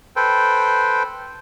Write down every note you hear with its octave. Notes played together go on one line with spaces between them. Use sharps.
A4 B4 C5 G5